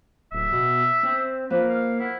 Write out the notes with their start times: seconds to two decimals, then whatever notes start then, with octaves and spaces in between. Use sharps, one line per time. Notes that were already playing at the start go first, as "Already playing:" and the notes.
0.32 D1 E5
0.51 B2
1.03 C4
1.50 F3 A#3 B4
1.69 F5
1.99 E4 F#5